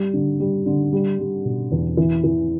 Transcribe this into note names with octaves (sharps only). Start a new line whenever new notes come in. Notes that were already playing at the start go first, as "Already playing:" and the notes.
Already playing: G3
D3
G3
D3
G3
G3
B2
E2
E3
E3